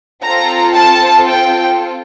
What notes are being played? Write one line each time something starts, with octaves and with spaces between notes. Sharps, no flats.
C4 F4 A4 A#5
A5
G5